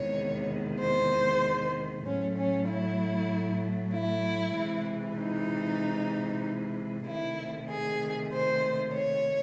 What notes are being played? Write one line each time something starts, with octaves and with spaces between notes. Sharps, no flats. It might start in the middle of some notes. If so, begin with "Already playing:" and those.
Already playing: E2 C3 D#3 G#3 C#5
C5
A2 F#3 A3 C#4
C#4
E4
E4
C3 E3 G#3
D#4
C3 D#3 A3 E4
G#4
C5
C#5